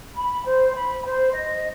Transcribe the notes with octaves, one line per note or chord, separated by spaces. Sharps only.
B5
C5
B5
C5
D#5